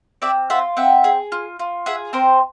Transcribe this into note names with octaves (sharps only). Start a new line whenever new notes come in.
C4 D5 E5
F4 E5 F#5
C4 E5 F#5
G#4
F4
F4
G#4 E5 F#5
C4 A#4 C5